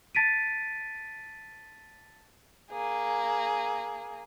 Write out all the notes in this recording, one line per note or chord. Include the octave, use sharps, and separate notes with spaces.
A5 A6 B6 D7 D#7
A#3 G#4